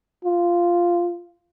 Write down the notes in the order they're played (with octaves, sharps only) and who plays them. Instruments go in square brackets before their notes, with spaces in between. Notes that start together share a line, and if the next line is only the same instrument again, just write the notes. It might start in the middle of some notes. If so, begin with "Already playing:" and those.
[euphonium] F4